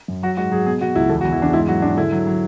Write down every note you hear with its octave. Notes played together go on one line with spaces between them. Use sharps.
F#2
F#3 F#4
G#2 F#4
F#3 G#4
B2 G#4
B2 F#4
C#2 E4
E2 A4
F#4
E2
E4
E2 D4
G#2 E4
F#3 F#4
G#2 D4
D3 E4
F#3
F#3